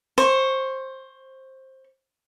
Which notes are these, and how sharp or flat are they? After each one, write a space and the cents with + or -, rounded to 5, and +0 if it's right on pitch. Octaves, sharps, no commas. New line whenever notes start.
C5 +15 C#6 -5